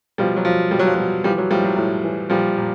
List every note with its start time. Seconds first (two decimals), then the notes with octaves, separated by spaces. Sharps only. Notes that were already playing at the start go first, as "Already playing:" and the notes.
0.18 B2 F3 G3
0.36 F#3
0.45 B2 F3
0.71 B2 G3
0.79 F#3
0.86 F3
0.95 B2 F#3
1.24 E3 F3 G3
1.38 F#3
1.50 A2 F3 G3
1.64 F#3
1.77 A2
2.04 E3
2.30 A#2 F3 G3
2.57 A#2